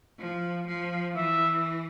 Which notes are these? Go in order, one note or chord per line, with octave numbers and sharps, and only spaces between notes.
F3
F3
E3 E5